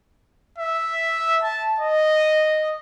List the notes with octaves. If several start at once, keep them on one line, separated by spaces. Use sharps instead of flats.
E5
A5
D#5